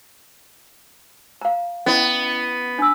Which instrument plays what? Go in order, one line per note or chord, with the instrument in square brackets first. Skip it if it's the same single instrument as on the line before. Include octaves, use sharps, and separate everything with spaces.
[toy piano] F5 A#5
[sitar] B3 [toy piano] C#4 E4 D#5
[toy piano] D4 E6